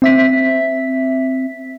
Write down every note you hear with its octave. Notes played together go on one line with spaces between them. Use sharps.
C4 E5 B6